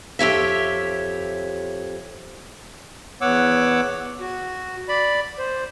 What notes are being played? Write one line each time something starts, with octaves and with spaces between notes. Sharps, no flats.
F2 G4 C#5 E5
E2 B3 C#5 F#5 D6 E6
F#4
D5 B5
C5